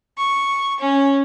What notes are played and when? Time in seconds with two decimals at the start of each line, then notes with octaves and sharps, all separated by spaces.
0.18 C#6
0.79 C#4